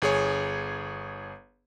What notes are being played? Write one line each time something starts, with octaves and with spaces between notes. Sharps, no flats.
G1 G#4 C#5